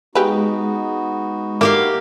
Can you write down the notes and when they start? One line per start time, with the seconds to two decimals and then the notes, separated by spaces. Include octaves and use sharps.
0.15 G#3 B3 D#4 F#4 G4 B4
1.61 A#3 E4 G4 F5